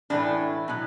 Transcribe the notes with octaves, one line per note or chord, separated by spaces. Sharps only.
A2 E3 A3 D4
B2 F#3